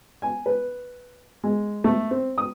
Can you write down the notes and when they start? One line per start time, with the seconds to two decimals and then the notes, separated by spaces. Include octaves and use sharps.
0.22 G#5
0.46 B4
1.44 G#3
1.84 A3
2.11 C4
2.38 D#6